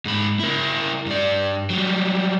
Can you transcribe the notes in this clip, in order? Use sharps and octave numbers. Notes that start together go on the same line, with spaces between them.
G#2 B5
E4 A#4
G2 D5
F#3 G3